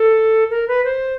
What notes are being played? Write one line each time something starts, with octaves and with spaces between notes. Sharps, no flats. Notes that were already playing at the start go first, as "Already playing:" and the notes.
Already playing: A4
A#4
B4
C5